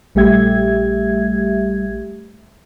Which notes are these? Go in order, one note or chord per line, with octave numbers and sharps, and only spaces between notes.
A#1 G3 A3 G4 E5 G#6